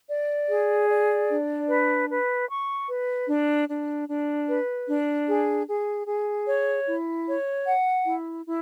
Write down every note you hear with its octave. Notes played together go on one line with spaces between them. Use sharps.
D5
G#4
D5
D4
B4
B4
C#6
B4
D4
D4
D4
B4
D4
G#4
G#4
G#4
C#5
E4
C#5
F#5
E4
E4